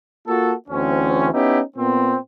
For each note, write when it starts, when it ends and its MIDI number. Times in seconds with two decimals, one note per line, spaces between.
0.27 0.53 58
0.27 0.53 65
0.27 0.53 66
0.27 0.53 69
0.69 1.29 38
0.69 1.29 52
0.69 1.29 60
0.69 1.29 61
1.32 1.61 59
1.32 1.61 61
1.32 1.61 63
1.32 1.61 64
1.32 1.61 67
1.77 2.16 46
1.77 2.16 59
1.77 2.16 60